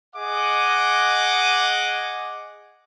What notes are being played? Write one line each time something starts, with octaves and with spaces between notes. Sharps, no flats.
G#4 D#5 F#5 D6